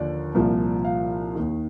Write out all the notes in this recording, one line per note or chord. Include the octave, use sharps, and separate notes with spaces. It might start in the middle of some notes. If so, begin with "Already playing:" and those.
Already playing: D#2 D3 F3 D5
C2 A#2 F3
F5
D#2 D#3